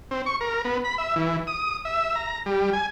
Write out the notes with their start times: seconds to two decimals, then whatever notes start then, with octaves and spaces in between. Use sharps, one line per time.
0.11 C4
0.26 C#6
0.41 A#4
0.65 B3
0.84 B5
0.98 E5
1.16 E3
1.47 D#6
1.85 E5
2.16 A#5
2.46 G3
2.73 G#5